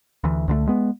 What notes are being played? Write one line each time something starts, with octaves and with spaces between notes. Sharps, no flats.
D2 E3
C#2 D3 F#3 A3
G#3 B3